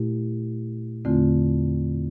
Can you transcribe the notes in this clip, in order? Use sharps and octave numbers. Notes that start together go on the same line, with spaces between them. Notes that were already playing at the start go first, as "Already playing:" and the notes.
Already playing: A#2 A3 E4 G4
E2 D3 A3 C4 F4